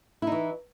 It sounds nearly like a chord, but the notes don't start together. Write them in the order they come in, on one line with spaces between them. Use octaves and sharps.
E4 D#4 E3